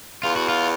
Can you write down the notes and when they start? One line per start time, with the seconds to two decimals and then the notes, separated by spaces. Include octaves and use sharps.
0.23 E2 F4
0.36 F#4
0.49 F4